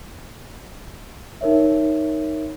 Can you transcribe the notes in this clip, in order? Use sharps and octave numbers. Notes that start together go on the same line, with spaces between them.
D#4 A#4 C#5 E5